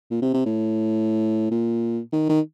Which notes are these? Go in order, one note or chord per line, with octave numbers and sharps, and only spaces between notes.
A#2
C3
C3
A2
A#2
D#3
D#3